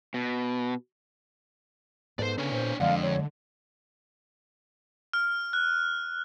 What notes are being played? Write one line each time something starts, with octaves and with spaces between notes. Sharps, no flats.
B2
G#2 B3 A4 C5 D5
C#3 D4 C#5
A#2 C5
F2 D3 G#3 D5 F5 F#5
D3 C#5
F6
F#6